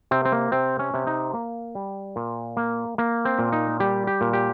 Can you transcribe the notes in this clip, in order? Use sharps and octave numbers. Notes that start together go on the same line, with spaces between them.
C3 C4
C4
A#3
C3 C4
C#4
C3
D#4
A#3
G3
A#2
A#3
A#3
C4
A#2
D#4
G3 G4
G4
A#2
G4